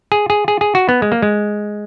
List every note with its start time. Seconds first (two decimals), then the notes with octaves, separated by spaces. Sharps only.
0.12 G#4
0.30 G#4
0.48 G#4
0.61 G#4
0.75 F#4
0.89 B3
1.02 G#3
1.12 A#3
1.22 G#3